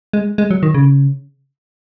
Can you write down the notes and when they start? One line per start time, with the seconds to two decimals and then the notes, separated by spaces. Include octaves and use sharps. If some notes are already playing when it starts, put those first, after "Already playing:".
0.13 G#3
0.38 G#3
0.51 F#3
0.63 D#3
0.74 C#3